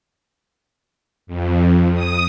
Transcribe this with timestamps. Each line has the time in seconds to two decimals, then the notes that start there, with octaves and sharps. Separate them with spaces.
1.27 F2
1.94 D#6